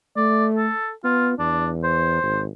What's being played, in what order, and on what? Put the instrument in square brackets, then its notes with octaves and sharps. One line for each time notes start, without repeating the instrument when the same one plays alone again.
[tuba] A3 [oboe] D5
[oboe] A4
[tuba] B3 [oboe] F4
[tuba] E2 [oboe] D4
[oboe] C5
[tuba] G#1